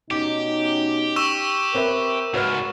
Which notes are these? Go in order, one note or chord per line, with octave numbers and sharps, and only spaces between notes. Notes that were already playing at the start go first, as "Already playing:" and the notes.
B2 C#4 D#4 G4 D6
C#6 E6 E7
C4 A#4 B4 E5
C#2 G#2 F#4 B4 F6